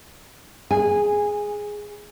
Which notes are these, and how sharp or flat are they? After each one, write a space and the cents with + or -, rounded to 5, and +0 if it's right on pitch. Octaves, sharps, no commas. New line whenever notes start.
G#4 +0 G#5 -15